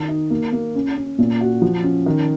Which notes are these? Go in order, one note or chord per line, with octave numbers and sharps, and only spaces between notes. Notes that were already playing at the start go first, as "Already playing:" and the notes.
Already playing: D#3
D#4
A#3
A#3
C#4
C#4
A#2
F#4
F3
C#4
D#3